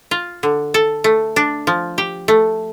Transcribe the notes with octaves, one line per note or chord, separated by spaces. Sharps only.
F4
D3
A4
A3
D4
F3
G4
A3